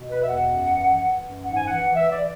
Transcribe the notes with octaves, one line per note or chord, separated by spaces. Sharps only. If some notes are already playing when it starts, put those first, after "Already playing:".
Already playing: B2
B4
E2 E5
F#5
F#2
E3
E3
F#2
G#2 F#5
G#5
E3 F#5
E3 E5
D5